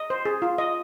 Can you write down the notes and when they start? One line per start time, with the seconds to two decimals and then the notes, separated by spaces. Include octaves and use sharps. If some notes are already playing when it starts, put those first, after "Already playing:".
Already playing: D#5
0.10 C5
0.25 G#4
0.42 F4
0.58 D#5